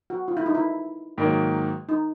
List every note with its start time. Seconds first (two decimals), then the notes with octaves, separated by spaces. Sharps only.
0.10 F#4
0.28 F4
0.37 E4
0.46 D#4
0.55 E4
1.18 G#2 D#3 F#3 A#3 D#4
1.89 D#4